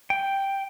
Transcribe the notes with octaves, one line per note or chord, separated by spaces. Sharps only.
G5